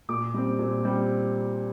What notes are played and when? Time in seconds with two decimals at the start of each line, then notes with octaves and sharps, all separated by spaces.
0.09 A#2 D6
0.34 G3 C4
0.59 A#2
0.84 G3 C4